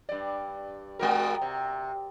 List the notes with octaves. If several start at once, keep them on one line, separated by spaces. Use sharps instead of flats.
G2 D5
G#3 F#4 A#4
C3